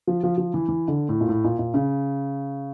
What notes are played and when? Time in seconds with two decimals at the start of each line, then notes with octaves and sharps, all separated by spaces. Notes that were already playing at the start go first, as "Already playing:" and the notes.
0.07 F3
0.24 F3
0.38 F3
0.54 E3
0.69 E3
0.88 D3
1.09 A2
1.21 A#2
1.29 A2
1.44 A#2
1.59 A#2
1.74 C#3